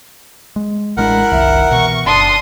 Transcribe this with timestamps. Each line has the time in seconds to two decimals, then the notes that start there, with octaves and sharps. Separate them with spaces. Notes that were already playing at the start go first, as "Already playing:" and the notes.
0.56 G#3
0.97 A1 G#3 D4 E4 A#4 F#5
1.31 F#1 C2 D#3 E5
1.71 B2 E3 C#6
2.06 F#1 D4 A5 C6 D#6